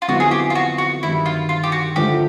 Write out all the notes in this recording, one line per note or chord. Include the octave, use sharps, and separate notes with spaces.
F4
F2 D3 F#3 B3 E4 F#4
G#4
G4
F4
F#4
F#4
G2 D#3 F#3 E4
F4
F4
G4
F#4
D3 F3 A3 G4